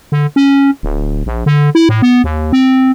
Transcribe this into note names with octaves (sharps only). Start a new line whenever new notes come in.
D3
C#4
D1
A#1
D3
E4
A2
B3
D#2
C4